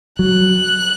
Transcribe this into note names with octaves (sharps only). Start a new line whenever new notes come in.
F#3 F#6